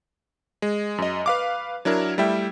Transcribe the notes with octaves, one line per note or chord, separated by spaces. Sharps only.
G#3
F#2 D#5
B4 F5 D6
F#3 D4 E4 A#4
G3 A3 E4 E5 G5